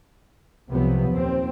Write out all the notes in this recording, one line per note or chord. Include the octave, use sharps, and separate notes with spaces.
C2 C3 F3 F#3 B3
D#2 A#2 C4